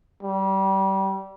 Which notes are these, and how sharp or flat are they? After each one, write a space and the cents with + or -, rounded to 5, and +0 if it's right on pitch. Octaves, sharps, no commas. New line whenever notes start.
G3 -25